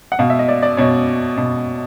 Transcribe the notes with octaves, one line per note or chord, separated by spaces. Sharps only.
F#5
B2 F5
E5
D#5
D5
D5
B2 C#5
B2